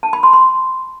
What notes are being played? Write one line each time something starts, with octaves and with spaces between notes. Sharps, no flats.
A5
B5
C6
C6